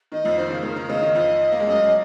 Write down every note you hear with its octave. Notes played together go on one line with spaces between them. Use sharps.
D#3 D#5
F2 F3
D#3 C5
C#3
C#3 A#4
D#3
C#3 D#5
D#3
F2 F3
A#3
G#3
F#2 F#3 D#5